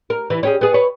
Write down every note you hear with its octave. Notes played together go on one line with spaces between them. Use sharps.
A#4
E3
C#4 G4 G#4
B3 G#4
B4 C#5